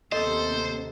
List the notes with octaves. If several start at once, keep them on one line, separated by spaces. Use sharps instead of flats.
D#2 C3 B3 A4 C5 D#5